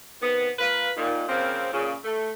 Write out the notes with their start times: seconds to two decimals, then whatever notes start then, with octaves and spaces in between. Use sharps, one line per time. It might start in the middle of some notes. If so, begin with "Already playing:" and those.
0.22 C3 D#3 B3
0.59 A#3 F4 A#4 B4
0.96 A#2 D#3
1.29 C#3 F3 A#3 C4
1.73 A#2 C#3
2.04 A3